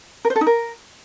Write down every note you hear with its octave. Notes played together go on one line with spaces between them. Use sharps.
A#4
C5
A4
D#4
A#4